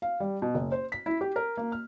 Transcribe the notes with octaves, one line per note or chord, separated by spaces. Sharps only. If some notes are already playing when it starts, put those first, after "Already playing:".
F5
G3
B2
F#1
C5
B6
E4
G4
A#4
A#3
F6